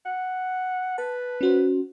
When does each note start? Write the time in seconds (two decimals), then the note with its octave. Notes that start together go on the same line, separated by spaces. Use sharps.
0.06 F#5
0.98 B4 A5
1.41 C#4 F#4 C5